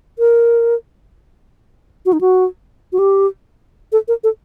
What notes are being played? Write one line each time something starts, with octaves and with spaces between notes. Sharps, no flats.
A#4
F#4
D#4
F#4
F#4
G4
A4
A#4
A4